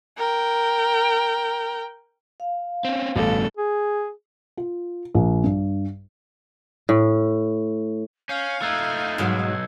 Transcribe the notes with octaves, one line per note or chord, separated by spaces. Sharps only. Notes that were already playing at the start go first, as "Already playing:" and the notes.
A#4 G5
F5
C4 C#4
A1 G2 B2 A4
G#4
F4
A#1
G2
A2
C#4 F5 G6 C7 C#7
A3 D#4 E6 F#6 G#6
B1 G#2 D#3 F#3